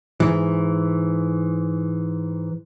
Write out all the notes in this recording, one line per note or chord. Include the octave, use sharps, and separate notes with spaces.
G#2 E3